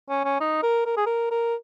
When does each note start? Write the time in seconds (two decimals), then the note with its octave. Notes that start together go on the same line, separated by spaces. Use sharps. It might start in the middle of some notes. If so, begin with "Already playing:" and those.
0.09 C#4
0.25 C#4
0.40 D#4
0.63 A#4
0.86 A#4
0.97 G#4
1.06 A#4
1.31 A#4